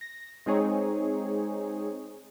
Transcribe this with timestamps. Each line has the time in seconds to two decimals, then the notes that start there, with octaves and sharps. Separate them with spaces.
0.01 A#6
0.46 G#3 C4 D#4 G#4 C#5